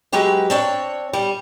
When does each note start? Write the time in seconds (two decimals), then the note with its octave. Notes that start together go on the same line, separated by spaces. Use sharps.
0.12 F#3 G#3 F#4 G4 B4
0.50 C4 D4 C#5
1.13 G3